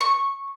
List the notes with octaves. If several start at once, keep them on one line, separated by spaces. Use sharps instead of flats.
C#6